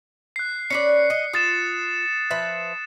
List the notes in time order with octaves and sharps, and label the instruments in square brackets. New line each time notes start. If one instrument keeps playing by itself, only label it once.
[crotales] F#6 C7
[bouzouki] C#4 B4 D5 [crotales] C#7
[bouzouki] D#5
[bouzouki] F4 [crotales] D#6 A6 E7
[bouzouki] F3 B4 E5